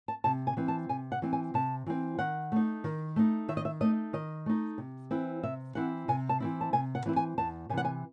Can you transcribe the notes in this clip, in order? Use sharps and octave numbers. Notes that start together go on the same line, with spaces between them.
A5
C3 A5
G#5
E3 C4
A5
C3 G#5
F#5
E3 C4
G#5
C3 A5
E3 C4
D#3 F#5
A3 D#4
D#3
A3 D#4
D#3 E5
D#5
E5
A3 D#4 D#5
D#3 D#5
A3 D#4
C3
E3 C4 E4
C3 E5
E3 C4 E4 F#5
C3 G#5
A5
E3 C4 E4
A5
C3 G#5
F#5
E3 C4 E4
G#5
E2 A5
C3 E3 G#5
F#5
G#5